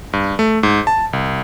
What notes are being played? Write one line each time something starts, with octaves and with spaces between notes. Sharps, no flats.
G2
A3
G#2
A5
C2